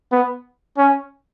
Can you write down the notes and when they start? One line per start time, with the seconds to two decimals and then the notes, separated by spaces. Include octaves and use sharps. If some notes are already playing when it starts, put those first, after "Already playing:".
0.12 B3
0.78 C#4